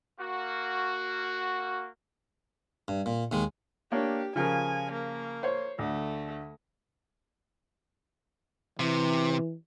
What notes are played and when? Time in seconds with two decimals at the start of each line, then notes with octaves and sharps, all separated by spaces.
0.20 A#3 F#4
2.88 G2
3.06 A#2
3.31 D#2 D#3 G#3
3.92 A#3 D4 G4 C#5
4.36 C#3 F3 A#4 G#5
4.91 A#3
5.43 C5 C#5
5.79 D2 A3
8.79 C3 E3